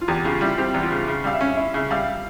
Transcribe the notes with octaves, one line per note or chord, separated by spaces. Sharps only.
F4
E2 G4
C#3 F4
G3 E4
C4 G4
E2
F4
C#3
C#3
G3 F5
E5
C#4
E4
C#3 E5
G3 F5